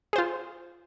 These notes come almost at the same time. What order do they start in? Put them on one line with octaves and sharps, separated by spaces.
G#4 C5 F4